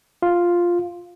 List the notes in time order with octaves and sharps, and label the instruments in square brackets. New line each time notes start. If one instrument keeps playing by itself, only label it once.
[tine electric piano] F4